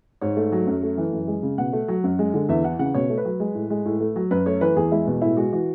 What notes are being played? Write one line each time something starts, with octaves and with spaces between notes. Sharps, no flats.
G#2 C#5
A3
F#3
F#2
A3
E3
F#2
G#3
C#3
B2 F#5
A3
F#3
F#2
G#3
D3
E2 E5
E3 F#5
C#3 F#5
B2 C#5
A3
B4
F#3
G#3
A2
G#3
A2
A3
F#3
F#2 B4
A3 C#5
E3 B4
E2 G#4
G#3 E4
B2
A2 E4
G#3 F#4
E3 F#4